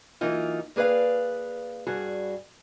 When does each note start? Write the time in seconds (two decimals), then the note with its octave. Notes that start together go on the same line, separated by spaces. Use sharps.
0.21 E3 F#3 A#3 D#4 F4
0.76 A#3 G#4 B4 D5 F5
1.87 G2 F#4 G#4